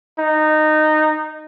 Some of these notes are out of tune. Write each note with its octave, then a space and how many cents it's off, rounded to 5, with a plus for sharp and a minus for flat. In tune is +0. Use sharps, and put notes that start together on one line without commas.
D#4 -15